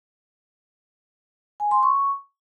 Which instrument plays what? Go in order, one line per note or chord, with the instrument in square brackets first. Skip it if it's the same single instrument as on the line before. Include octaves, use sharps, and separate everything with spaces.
[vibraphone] G#5
C6
C#6